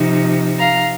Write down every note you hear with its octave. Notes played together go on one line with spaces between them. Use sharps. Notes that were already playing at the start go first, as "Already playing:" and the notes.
Already playing: C3 F3 D#4
F5 A#5